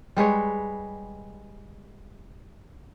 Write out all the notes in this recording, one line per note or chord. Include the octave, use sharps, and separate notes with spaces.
G3 G#3 B4 C#5